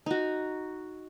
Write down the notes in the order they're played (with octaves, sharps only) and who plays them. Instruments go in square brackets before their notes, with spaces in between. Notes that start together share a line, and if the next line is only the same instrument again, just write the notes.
[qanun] D#4 F#4